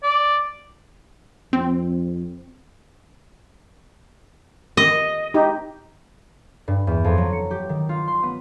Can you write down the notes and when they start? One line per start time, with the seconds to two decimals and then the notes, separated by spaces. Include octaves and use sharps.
0.03 D5
1.53 F2 C4
4.77 D#5
5.34 D#4 G4
6.68 G2
6.87 E2
7.04 F2
7.18 F#3
7.33 C#7
7.51 G4
7.69 D#3
7.89 F4
8.08 C6
8.23 B3